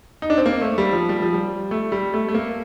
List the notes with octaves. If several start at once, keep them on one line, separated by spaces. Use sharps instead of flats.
D#4
D4
C4
A#3
A3
G3
F3
G3
F3
G3
A3
G3
A3
A3
A#3